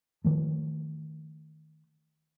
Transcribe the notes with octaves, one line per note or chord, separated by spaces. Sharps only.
D#3 F3 A3